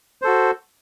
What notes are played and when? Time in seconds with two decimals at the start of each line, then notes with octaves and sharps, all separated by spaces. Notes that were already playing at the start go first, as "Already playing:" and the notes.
0.22 C5
0.24 A4
0.27 F#4